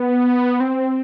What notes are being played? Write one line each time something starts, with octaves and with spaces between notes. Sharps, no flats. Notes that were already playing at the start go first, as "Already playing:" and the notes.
Already playing: B3
C4